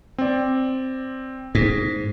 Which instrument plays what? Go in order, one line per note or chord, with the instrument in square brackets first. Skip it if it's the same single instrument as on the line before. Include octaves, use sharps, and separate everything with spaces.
[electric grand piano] C4 D5
[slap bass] G#2